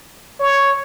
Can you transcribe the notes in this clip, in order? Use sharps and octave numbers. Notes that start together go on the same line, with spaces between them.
C#5